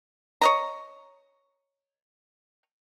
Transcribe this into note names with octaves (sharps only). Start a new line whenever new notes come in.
C#5 D#5 A#5